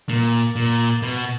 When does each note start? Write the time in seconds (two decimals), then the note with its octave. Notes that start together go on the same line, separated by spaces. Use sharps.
0.09 A#2
0.56 A#2
1.02 B2